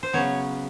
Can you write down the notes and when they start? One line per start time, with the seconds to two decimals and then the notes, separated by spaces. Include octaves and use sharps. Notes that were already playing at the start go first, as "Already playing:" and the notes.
0.03 C5
0.13 C#3 F#3 B3 C#5